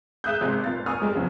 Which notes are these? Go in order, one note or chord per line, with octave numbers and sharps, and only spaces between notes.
G#4 E5 D#6 F#6 G6
G#1 C3 G#3
G1 A#2 F5 A6
G#5 C#6 D#6 F6
G3 G#3
E2 C#3 F3 F4